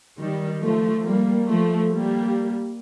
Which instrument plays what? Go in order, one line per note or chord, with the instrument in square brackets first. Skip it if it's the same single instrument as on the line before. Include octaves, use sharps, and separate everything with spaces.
[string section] D#3 G3
F3 A3
G3 A#3
F3 A3
G3 A#3